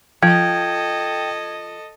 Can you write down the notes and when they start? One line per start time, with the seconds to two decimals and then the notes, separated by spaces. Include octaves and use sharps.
0.23 F3 A4 D#5 G5 G#6